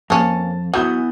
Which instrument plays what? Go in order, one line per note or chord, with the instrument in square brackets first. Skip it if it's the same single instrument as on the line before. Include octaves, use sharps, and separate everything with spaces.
[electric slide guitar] F2 [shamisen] A#3 C#4 [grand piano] A5
[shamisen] F#3 [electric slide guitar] B3 E4 F#5 [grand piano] D#6 G6